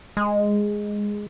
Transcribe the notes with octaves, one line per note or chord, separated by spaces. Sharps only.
G#3